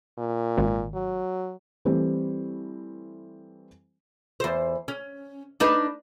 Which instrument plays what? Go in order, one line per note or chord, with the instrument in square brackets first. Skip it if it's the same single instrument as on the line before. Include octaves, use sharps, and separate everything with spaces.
[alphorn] A#2
[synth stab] G#1
[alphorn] F#3
[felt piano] E3 G3 A3 C4
[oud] E2 C5
C#4
D4 D#4 B4